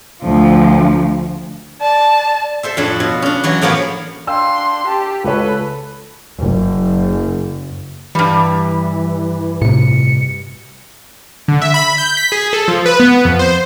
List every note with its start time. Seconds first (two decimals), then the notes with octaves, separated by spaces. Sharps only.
0.23 D2 F3
1.81 D5 A5
2.63 A4 C5 E5
2.77 F2 A2 D4 A4 C#5
3.00 B2
3.22 C#4 D4
3.43 E3 F#3 F#4
3.61 A2 F3 A#3 B3 C#5
4.27 D4 F5 G5 C6 E6
4.87 G4 A5
5.24 C#2 A4 B4 C#5
6.38 F#1
8.15 G2 E3 G3
9.62 A2 C3 C#7
11.48 D3
11.62 E5
11.74 B5
11.98 G6
12.17 B6
12.32 G#4
12.53 A4
12.68 F3
12.86 B4
13.00 B3
13.25 F2
13.39 C5